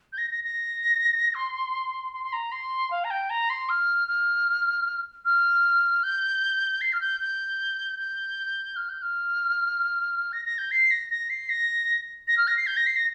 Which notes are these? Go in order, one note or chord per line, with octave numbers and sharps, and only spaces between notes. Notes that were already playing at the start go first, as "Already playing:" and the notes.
G6
A#6
A#6
A#6
C6
C6
C6
A#5
C6
F5
A#5
G5
A#5
C6
F6
F6
F6
G6
C7
F6
G6
G6
G6
F6
G6
F6
A#6
A#6
G6
C7
A#6
A#6
C7
A#6
A#6
F6
A#6
C7
G6
A#6
C7
A#6